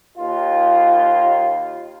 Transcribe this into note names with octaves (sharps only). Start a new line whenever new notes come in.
D#2 F4